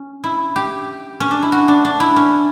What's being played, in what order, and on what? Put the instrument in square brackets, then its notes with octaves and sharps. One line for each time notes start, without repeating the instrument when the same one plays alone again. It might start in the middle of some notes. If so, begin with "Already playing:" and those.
Already playing: [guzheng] C#4
E4
G4
C#4
D4
E4
F#4
D4
D4
E4
C#4